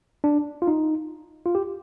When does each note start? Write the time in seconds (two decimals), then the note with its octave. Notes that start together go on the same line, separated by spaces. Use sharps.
0.24 D4
0.62 F4
0.67 D#4
1.46 F4
1.55 G4